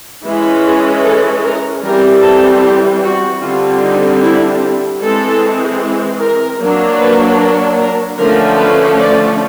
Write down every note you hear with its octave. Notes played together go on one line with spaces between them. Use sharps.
E3 G#3 C#4
G#4
A4
A#4
E3 G3 C4 A#4
A4
G4
F#4
D3 G3 C4 F4
D#4
E4
E3 G#3 C4 A4
A#4
F#3 A#3 D4
B4
A#4
A#4
D3 F3 A3 C#4 A#4
B4
D5